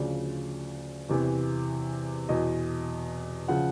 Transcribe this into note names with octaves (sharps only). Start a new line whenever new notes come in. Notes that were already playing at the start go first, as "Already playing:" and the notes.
Already playing: D2 C#3 F3 D5
E2 C3 E3
E2 B2 D#5
C#3 F3 F#5